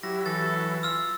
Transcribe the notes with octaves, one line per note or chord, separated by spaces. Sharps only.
F#3 E4 G4 A#6
E3 A4 A6
F4 E6 F6